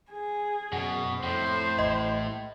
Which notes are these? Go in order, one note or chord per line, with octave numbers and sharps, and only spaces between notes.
G#4
F#2 B2
F2 A2 C5
A1 D#5